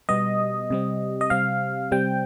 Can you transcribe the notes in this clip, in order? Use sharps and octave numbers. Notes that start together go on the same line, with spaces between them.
B2 G3 B3 D#5
C3 G3 C4
D#5
C3 G3 C4 F5
C3 G3 C4 G5